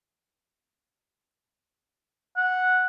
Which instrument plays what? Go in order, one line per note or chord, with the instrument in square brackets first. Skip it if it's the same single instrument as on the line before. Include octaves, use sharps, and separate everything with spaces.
[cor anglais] F#5